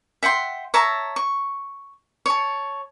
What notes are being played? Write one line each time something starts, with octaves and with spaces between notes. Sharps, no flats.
E5 F#5 G5 C6
C#5 E5 A5 A#5
C#6
C#5 A5